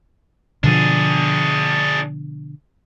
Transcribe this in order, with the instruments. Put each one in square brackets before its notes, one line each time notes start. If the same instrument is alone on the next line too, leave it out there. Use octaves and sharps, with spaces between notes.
[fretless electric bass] B2 D3 F3 [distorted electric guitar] D4 G#4